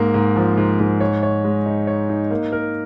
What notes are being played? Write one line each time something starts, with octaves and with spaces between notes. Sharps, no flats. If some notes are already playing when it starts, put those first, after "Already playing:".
Already playing: G#2 A#3
G#2
F3
G#2
G#2
C#5
C#5
G#3
D#4
C#5
D#4
A#3
A#4